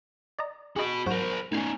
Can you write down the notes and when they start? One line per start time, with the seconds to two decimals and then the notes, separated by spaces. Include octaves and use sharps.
0.39 D5 D#5 A#5
0.76 F#4 G#4 D#5 B5
1.06 G#2 F#3 F#4 A#4 C5
1.52 A2 C#4 D#4 G#5 C7